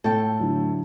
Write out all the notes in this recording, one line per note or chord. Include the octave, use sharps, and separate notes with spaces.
A2 A4 G5
D3 F#3 E4